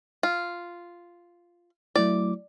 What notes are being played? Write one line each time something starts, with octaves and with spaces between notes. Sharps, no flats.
F4
F#3 A3 E4 D5